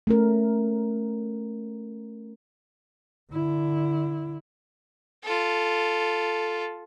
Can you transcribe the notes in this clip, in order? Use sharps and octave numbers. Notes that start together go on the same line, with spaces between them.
A3 C#4 A#4
D3 E4
F4 A4